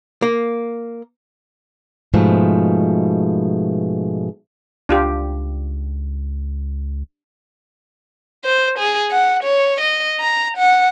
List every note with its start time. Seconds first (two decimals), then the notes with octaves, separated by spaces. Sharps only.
0.22 A#3
2.14 G#2 B2 F3 A3
4.89 C#2 D4 F4 G4
8.45 C5
8.79 G#4
9.11 F#5
9.44 C#5
9.81 D#5
10.20 A#5
10.57 F#5